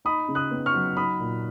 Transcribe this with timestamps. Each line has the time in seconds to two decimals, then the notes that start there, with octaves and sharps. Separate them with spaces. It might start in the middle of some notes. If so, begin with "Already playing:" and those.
0.05 D#4 B5 D#6
0.28 C#3
0.35 D#6 F#6
0.51 B3
0.66 C#6 F6
0.74 F#3
0.96 D#4 B5 D#6
1.20 A#2